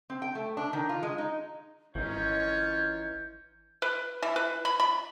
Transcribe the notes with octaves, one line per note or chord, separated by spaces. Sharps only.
C4
G5
A3
D4
D#3
F4
G#3
D#4
G#1 E3 C#4 D#4 F4 C#5 G6
B4
E3
B4
B5
B5